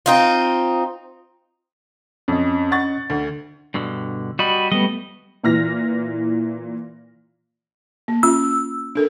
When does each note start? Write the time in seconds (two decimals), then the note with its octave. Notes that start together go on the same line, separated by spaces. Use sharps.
0.06 C4 D#4 F4
2.28 F2 C#4 D#5
2.71 F#5 C#6 A6
3.10 D2
3.74 G2 B2 D3
4.39 G3 F#4 D#5 B5
4.72 G3 A3 B3 D#5
5.44 A#2 E3 F6 A#6
8.08 A#3
8.23 C#4 F4 E6
8.95 D4 A4 A#4